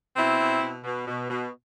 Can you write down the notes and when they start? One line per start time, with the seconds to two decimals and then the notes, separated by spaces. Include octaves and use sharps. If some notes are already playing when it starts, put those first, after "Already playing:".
0.16 B2 C4 E4
0.39 B2
0.62 B2
0.84 B2
1.08 B2
1.30 B2